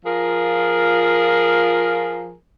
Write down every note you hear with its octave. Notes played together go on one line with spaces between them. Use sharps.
F3 F4 G#4 A#4